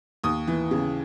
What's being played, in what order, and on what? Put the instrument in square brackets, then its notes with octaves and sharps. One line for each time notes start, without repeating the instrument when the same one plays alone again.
[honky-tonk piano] D#2 D#6
E3
C#3